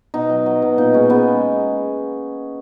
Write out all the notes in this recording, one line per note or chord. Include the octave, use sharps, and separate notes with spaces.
B2 D#4
F#3
F#3
B2
A#2 D#4
G#3 C#4
G#3 B3